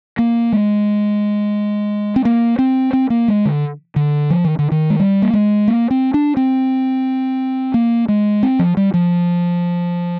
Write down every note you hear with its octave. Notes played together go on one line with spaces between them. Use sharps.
A#3
G#3
C4
A#3
C4
C4
A#3
G#3
D3
D3
F3
D#3
D3
D#3
G#3
G3
A#3
G#3
A#3
C4
D4
C4
A#3
G#3
C4
F3
G3
F3